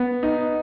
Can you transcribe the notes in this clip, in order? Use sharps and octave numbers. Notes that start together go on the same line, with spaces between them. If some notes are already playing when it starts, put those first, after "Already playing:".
Already playing: B3
D#4